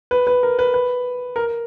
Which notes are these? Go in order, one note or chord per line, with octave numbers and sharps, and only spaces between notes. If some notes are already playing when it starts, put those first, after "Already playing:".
B4
B4
A#4
B4
B4
A#4